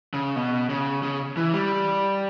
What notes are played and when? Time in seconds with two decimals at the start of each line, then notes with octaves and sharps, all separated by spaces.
0.14 C#3
0.36 B2
0.70 C#3
1.03 C#3
1.37 E3
1.54 G3